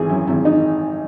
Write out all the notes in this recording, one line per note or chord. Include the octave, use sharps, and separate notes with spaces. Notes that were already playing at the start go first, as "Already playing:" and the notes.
Already playing: G#1 E3 G#4
F#2 E4
G#1 E4
D#4